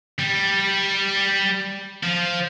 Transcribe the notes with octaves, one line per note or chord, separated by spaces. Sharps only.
G3
F3